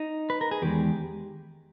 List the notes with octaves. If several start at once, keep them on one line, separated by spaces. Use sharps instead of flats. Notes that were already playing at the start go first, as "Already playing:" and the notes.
Already playing: D#4
B4
A#4
G#4
E2 D#3 G#3 G4